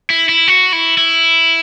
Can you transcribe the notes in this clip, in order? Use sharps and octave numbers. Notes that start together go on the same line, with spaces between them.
E4
E4
F#4
E4
E4